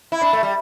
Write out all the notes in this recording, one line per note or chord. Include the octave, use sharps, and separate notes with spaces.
E4
D4
A3
G3